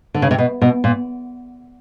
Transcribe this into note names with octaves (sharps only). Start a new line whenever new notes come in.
D3
C#3
C3
B2
B2
A#2